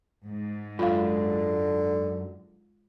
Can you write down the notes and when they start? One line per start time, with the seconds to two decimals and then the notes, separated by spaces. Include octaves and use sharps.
0.25 G#2
0.79 F#2 D3 F4 F5